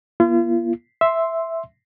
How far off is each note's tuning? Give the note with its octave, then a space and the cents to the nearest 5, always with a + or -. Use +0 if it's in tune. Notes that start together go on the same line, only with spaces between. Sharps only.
A#3 +45 F4 -40
E5 +0 C6 +0